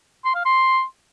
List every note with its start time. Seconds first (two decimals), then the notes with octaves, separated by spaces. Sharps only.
0.25 C6
0.35 F5
0.45 C6